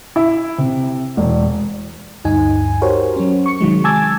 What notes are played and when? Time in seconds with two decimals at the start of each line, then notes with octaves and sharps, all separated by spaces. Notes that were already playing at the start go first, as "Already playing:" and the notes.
0.16 E4
0.58 C3
1.17 E1
2.25 D2 G2 D#4 G#5
2.82 F#4 G4 A#4 C5 C#5
3.16 F#3 C#4
3.46 C#6 C#7
3.60 C3 D#3 F#3 G#3
3.84 G#5 A5 D6 E6 G#6 A6